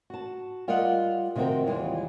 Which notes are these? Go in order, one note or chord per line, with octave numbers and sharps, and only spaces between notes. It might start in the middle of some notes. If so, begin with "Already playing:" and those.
F#4 A5
G3 F4 A#4 D5 D#5 F#5
C3 D#3 C4 F#4 A#4 G5
D#2 E3 G3 G#3 F4